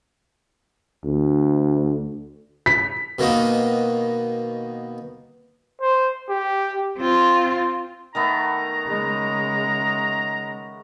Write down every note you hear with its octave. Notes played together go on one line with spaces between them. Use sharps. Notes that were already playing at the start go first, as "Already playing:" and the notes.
D2
B6
B2 D#3 A#3 B3 D#4
C5
G4
C4 F4
D#3 A3 B3 A#5
C#3 G#3